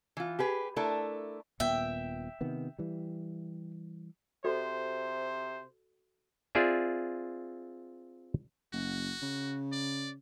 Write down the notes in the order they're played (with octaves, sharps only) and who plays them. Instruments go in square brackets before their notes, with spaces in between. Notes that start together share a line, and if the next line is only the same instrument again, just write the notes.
[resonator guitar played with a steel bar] E3 F4
G4 G#4 B4
A3 D4 E4 A4 A#4
[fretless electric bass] D#1 A#2 B3 [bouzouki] E5 G5
[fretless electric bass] C3 D#3 B3
E3 G3
[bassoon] C3 [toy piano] F#4 A4 D5 [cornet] C5
[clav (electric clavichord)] C4 F4 G#4 D5 E5
[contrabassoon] F#1 [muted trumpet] F#4
[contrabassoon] C#3
[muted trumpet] D5